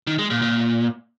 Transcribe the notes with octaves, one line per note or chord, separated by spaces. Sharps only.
D#3
G#3
A#2
A#2